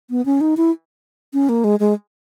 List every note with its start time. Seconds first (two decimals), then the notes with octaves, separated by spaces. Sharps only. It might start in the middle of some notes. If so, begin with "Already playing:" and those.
0.10 B3
0.26 C#4
0.41 D#4
0.57 E4
1.33 C#4
1.49 A#3
1.64 G#3
1.80 G#3